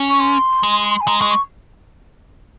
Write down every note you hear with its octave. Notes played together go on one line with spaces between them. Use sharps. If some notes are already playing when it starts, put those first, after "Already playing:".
Already playing: C#4
C#6
C6
G#3
G#5
G#3 A#5
C#6
G#3
C#6